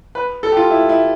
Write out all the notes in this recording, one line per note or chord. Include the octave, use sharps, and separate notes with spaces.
B4
A4
G4
F4
E4
E4